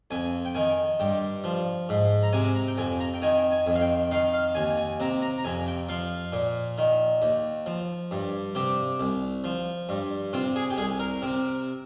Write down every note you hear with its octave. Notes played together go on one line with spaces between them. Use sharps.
F2 G#5
G5
D#3 G#5
G2 G5
F3
G#2
A#5
C3 G#5
A#5
G5
F2 G#5
A#5
G5
D#3 G#5
G#5
F2
F5
G5
D#3 F5
F5
D#2 G#5
G#5
C3 A#5
A#5
A#5
F2 G#5
G5
F3 F5
A#2
D#3
D#2
F3
G2
C3 G4
C2
F3
G2
C3 F4
G#4
G4
C2 G#4
A#4
C3